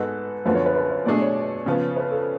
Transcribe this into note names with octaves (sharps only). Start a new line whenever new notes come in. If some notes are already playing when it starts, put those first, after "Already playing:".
Already playing: G#2 G#3 B3 F#4 A4 B4
F#2 D3 F3 B3 F#4 B4
C#5
B4
B4
C#5
B2 F#3 A3 D4 G#4 D5
C#5
C#3 F3 B3
B4
A4